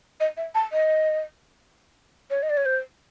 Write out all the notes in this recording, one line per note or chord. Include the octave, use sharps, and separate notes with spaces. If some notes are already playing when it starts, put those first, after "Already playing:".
D#5
E5
A5
D#5
C#5
D#5
D5
C#5
C5